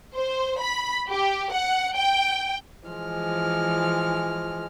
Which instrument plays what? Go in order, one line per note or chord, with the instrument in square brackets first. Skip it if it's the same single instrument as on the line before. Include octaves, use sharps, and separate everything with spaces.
[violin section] C5
B5
G4
F#5
G5
[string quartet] E3 F3 G#3 F6